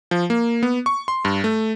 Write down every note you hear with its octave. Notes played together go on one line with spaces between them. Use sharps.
F3
A#3
B3
C#6
C6
G2
A3